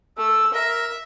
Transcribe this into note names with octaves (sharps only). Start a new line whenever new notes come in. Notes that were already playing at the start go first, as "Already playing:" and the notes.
A3 E6
A#4 E5